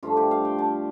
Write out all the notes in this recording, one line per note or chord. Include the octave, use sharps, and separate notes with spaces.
G2 F3 A3 D4 F4
G4
F5
G5
A5